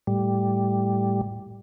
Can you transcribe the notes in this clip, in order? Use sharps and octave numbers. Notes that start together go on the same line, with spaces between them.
A2 G3